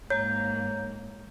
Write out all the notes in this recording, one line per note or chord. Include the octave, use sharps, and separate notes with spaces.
G#2 A#3 C#5 A#5 G6